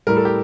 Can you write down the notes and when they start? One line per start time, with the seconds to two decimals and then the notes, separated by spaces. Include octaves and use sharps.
0.07 A2 G3 A#4
0.17 A4
0.25 G4